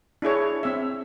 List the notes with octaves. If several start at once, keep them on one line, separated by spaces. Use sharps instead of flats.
D4 E4 G#4 C#5
C4 E5